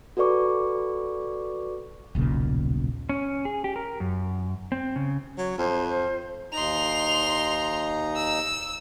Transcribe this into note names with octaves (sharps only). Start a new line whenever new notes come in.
F#4 A4 B4 D5 C#6 D6
D#1 B1 A#2 C#3
C#4
G#4
G4
A#4
F#2
C4
C#3
F#3 C#5
F2 C5
C5
D#2 D#4 A#5 C6 F7
E6